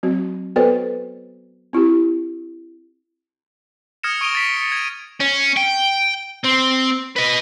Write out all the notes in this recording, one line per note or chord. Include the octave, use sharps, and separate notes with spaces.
F#3 C4 F#4
B3 F#4 A4 B4 C5 D5
C4 E4 F4 G4
D#6 F6 G#6 A#6 C#7 E7
C#6 D#6 D7 D#7 F7 G7
A6 B6 D7
C#7
G#6 D#7
C#4
G5
C4
B4 D#5